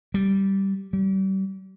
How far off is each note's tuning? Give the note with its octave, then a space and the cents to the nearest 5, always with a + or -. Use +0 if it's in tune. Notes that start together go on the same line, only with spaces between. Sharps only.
G3 -10
G3 -35